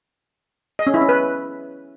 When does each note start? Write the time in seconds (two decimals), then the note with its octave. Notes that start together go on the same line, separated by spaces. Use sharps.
0.79 D#5
0.87 C#4
0.94 E4
1.01 C#4
1.09 B4